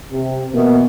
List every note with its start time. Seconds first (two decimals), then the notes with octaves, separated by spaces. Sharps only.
0.11 C3
0.53 B2 E3 A#3